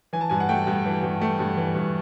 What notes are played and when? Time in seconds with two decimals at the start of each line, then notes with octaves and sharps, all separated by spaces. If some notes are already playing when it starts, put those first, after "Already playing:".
0.13 E3 G#5
0.21 A5
0.29 G2 G#5
0.40 F#5
0.49 A3 G5
0.67 G2
0.86 E3
1.03 G2
1.21 A3
1.39 G2
1.57 E3
1.75 G2